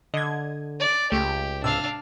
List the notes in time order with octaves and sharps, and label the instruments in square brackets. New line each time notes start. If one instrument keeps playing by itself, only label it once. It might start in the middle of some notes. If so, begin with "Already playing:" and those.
[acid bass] D3 [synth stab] D#5 G#6
[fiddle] D5
[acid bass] C#2 [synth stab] A3 [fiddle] G4
[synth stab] G#2 C3 E6 [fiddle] D4 F5